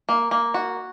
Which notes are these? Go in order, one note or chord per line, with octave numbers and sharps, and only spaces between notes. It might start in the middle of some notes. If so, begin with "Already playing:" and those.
A#3
A#3
F#4